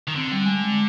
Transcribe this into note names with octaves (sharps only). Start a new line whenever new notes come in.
D#3
D3 C4
G3
G#3